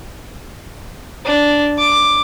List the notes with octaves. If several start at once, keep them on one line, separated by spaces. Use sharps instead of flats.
D4
D6